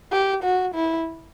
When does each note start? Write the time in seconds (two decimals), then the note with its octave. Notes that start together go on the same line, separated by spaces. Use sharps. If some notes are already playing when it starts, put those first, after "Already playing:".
0.12 G4
0.43 F#4
0.75 E4